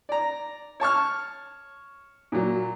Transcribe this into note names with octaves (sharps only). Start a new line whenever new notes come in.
D5 A#5
C#5 A5 C#6 F6
A#2 F#3